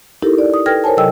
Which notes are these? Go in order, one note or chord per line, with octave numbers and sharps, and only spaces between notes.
D#4 E4 G4 A4 A#4
D5
D#6
A4 B4 G5 F6 G#6 A#6
A#4 C5 C#5 G#5 A5
C3 F#3 A4 D#5 G5 E6